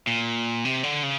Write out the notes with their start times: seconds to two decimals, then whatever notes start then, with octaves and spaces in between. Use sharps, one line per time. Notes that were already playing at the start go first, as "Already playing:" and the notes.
0.07 A#2
0.65 C3
0.84 D3
1.03 C#3